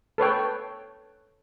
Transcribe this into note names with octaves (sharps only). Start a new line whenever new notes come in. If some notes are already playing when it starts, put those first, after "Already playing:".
A4 B4 C#5 G5